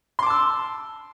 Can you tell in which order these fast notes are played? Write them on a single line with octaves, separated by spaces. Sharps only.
C6 D6 A5 E6